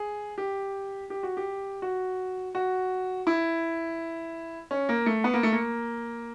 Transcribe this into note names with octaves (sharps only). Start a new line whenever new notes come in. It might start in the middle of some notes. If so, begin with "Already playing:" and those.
Already playing: G#4
G4
G4
F#4
G4
F#4
F#4
E4
C#4
A#3
A3
B3
A#3
A3
A#3